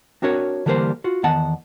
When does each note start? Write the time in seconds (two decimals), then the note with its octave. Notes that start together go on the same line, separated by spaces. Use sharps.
0.22 C4 D4 F#4 A#4 C#5
0.66 D3 E3 G3 A#3 A#4 C5
1.04 F4 F#4
1.23 E2 D#3 B3 F#5 A5